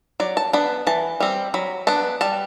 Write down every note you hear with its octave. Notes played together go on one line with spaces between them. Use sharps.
F#3 D5
A5
B3 D4 B5
E3 A5
G3 C4
F#3 B5
B3 D4 A5
G3 A5